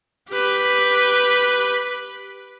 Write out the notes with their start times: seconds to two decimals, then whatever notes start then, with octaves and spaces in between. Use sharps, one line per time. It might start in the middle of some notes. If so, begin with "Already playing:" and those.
0.30 G4 B4